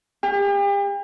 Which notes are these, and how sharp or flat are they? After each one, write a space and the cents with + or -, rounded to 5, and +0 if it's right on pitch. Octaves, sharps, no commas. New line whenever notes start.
G4 +40